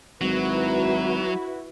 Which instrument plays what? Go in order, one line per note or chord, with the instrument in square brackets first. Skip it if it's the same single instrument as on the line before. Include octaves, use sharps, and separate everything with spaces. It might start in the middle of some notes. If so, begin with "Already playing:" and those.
[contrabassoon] G#1 [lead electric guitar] F#3 [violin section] E4 F#4 B4